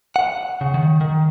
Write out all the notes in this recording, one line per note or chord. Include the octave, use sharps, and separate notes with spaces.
F#5
C#3
D#3
D#3